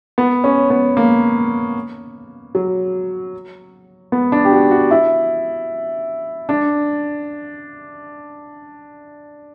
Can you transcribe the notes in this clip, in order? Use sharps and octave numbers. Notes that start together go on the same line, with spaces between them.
B3
C#4
B3
A#3
F#3
B3
D4
G4
F#4
F#4
E4
D4